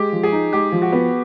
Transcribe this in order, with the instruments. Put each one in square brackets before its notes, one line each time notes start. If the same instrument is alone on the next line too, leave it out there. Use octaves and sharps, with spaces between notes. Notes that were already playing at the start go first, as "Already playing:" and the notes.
Already playing: [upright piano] G#3 [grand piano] G4
[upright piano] F3
[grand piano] G#4
[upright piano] D#4
[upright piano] G#3 [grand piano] G4
[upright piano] F3
[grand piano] F#4
[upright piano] B3